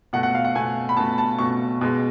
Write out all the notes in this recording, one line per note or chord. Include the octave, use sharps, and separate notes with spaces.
B2 A3 F#5
F#5
F5
F#5
B2 A3 G#5
B5
B2 A3 A5
A5
B2 A3 C#6
B2 G#3